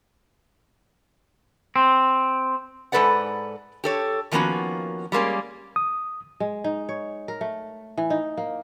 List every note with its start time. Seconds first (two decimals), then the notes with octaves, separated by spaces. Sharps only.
1.76 C4
2.92 G#2 A#3 A4 B4 D5 F#5
3.84 G4 A4 C#5
4.32 D#3 F3 A#3 B3 C#4 F#4
5.12 G3 G#3 A#3 C#4
5.76 D#6
6.40 G#3
6.64 D#4
6.89 C#5
7.28 A#4
7.41 A3
7.97 E3
8.10 D#4
8.37 A#3